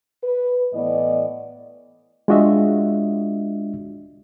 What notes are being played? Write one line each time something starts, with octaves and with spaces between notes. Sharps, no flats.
B4
A2 E3 B3 D5 D#5
G#3 D4 F4 F#4 D#5 E5